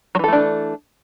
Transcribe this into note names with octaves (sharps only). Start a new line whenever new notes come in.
E3 F#3 A3 D4 A4